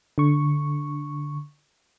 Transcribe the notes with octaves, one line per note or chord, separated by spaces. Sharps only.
D3 C#6